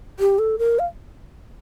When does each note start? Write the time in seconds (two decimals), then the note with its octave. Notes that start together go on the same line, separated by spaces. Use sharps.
0.20 G4
0.39 A4
0.59 A#4
0.79 F5